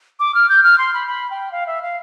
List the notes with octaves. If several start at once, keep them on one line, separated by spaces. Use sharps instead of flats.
D6
F6
G6
F6
C6
B5
B5
G5
F5
E5
F5